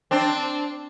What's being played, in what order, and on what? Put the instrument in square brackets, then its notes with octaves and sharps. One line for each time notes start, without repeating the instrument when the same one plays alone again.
[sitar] C4 D4